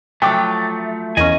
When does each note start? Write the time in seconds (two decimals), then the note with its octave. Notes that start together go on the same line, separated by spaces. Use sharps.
0.22 F3 F#3 A3 G5 D6
1.17 E2 A#3 C#4 D#5 G#5